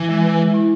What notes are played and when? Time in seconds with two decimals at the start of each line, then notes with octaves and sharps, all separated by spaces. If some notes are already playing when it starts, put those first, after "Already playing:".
Already playing: E3
0.09 G#3
0.24 B4
0.39 G#3
0.54 E4